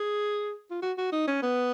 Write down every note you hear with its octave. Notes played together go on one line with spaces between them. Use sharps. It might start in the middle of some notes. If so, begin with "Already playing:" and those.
Already playing: G#4
F4
F#4
F#4
D#4
C#4
B3